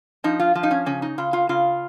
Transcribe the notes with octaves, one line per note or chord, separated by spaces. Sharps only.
F3 D#4
F4
F3 F4
D#4
C#4
C#3 C#4
D#4
C#3 F4
F4
C#3 F4